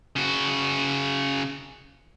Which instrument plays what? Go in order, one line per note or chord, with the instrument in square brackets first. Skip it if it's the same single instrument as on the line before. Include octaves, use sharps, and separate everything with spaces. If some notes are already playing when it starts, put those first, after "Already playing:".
[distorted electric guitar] C#3 F#4